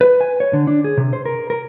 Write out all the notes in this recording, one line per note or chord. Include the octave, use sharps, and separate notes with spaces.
B4
G#5
C#5
D3
D4
G#4
C3
C5
A#4
A#4